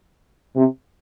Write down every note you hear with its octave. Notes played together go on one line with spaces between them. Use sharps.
C3